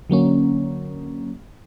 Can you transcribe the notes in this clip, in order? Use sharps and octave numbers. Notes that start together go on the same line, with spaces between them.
D3 F#3 A#3 C#4